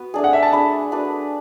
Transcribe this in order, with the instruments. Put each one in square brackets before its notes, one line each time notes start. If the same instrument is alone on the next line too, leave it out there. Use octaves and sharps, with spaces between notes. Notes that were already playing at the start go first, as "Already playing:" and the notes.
Already playing: [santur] B3 F#4 B4
A3 D4 G#4
[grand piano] F#5
E5
A5
[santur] A3 D4 G#4 [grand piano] B5
[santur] B3 D4 F#4 B4